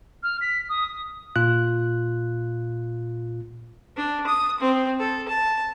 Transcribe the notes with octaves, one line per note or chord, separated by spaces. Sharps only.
F6
B6
D#6
A#2 F4 F#6
D4
D#6
C4
A4
A5